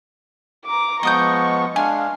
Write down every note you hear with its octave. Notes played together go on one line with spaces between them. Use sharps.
A#5 D6
F3 G#3 B3 D#5 C#6 D#6 G6
G#3 D4 F5 G#5 F6